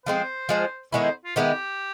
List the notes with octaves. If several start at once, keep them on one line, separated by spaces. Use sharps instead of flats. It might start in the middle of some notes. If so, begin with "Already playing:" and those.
F3 G#3 C4 C5
F3 G#3 C4
D#3 G#3 B3 E4 C#5
C5
F4
D#3 G#3 B3 E4 G4